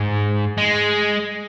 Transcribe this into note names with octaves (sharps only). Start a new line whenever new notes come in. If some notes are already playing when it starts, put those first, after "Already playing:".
Already playing: G#2
G#3